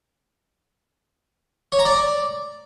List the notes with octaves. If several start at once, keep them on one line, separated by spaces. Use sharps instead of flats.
C#5
A#5
D5